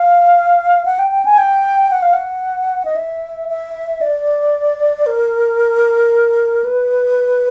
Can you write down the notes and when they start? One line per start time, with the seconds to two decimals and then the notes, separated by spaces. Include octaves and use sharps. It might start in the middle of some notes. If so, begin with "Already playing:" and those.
Already playing: F5
0.85 F#5
0.99 G5
1.11 G5
1.25 G#5
1.38 G5
1.91 F#5
2.02 F5
2.13 F#5
2.85 D#5
2.96 E5
3.48 E5
4.01 D5
5.06 A#4
6.64 B4